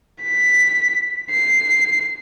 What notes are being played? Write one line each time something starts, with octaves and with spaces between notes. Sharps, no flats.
B6
C7